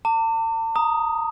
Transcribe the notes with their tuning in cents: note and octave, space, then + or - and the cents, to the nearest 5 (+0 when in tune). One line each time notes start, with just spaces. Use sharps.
A5 +45 D6 +0
A#5 +5 D#6 +0